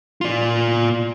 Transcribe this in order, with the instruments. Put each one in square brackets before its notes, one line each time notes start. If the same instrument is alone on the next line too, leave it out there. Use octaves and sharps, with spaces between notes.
[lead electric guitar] F4 D5